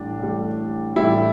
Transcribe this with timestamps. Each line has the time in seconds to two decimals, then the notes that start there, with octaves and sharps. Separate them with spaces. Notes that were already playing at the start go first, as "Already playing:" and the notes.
Already playing: A1 A2 G3 D4
0.20 A1 A2 G3
0.96 A1 A2 G3 E4